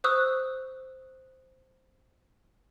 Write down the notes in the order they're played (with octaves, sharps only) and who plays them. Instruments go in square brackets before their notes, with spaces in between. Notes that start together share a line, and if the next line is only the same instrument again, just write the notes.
[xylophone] C5 C#6 D#6 E6 F#6